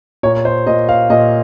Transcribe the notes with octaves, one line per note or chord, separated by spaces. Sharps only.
A#2 C#5
C5
A#2 D#5
F5
A#2 D#5